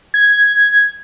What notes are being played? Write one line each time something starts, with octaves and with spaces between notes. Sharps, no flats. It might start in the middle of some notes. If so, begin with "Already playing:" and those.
G#6